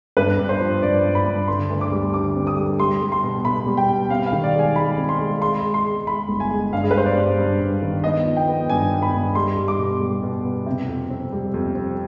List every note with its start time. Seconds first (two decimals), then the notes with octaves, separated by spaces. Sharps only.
0.17 G2 B4
0.39 G2
0.49 C5
0.61 F3
0.82 G2 D5
1.03 G2
1.15 B5
1.26 G2
1.48 D3 C6
1.70 D2
1.81 D6
1.92 G3
2.13 D3 D6
2.35 C4
2.47 D#6
2.57 G3
2.79 G3 C6
3.01 G3
3.12 C6
3.23 B2
3.45 B2 B5
3.66 G3
3.77 G5
3.88 B2
4.10 C4 F5
4.26 F5
4.32 D#3
4.43 D5
4.54 G#3 G#5
4.76 G#3 B5
4.98 C4
5.09 C6
5.19 G#3
5.41 G#3 C6
5.63 G#3
5.74 C6
5.85 G#3
6.07 G#3 B5
6.29 G1
6.40 G#5
6.51 G#3
6.73 G2 F5
6.83 G#4
6.91 B4
6.95 G3 C5
7.06 D5
7.16 G2
7.38 G2
7.60 G2
7.82 D#3
8.04 B3 D#5
8.26 F3
8.36 G5
8.48 B3
8.70 G2 G#5
8.91 B3
9.02 B5
9.13 G2
9.35 G3 C6
9.57 G3
9.68 D6
9.79 B2
10.00 G3
10.22 B2
10.45 B3
10.66 C3
10.88 F2
11.10 C4
11.32 G3
11.54 F2
11.75 C4